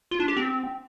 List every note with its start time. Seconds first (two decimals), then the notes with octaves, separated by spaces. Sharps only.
0.11 F4
0.20 D4
0.28 G4
0.36 C4